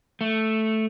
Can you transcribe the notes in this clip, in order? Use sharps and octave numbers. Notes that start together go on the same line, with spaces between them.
A3